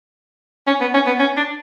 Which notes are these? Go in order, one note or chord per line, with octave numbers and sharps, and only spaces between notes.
C#4
B3
C#4
B3
C#4
D4